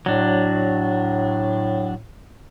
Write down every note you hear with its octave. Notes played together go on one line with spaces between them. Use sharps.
A2 F#3 D4